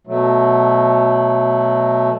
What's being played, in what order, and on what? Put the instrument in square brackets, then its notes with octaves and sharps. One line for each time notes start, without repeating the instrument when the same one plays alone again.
[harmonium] B2 F#3 A3